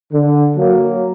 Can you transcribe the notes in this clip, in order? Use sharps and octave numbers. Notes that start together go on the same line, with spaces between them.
D3
F#3 A#3